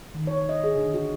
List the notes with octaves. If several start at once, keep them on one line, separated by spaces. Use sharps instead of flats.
D#3
C#5
D#5
G#4
D3
F#4